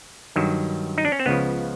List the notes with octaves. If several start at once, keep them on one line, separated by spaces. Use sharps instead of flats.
G2 D#3 F#3
D#4
D4
C#4
C4
C#2 C#3 F3 B3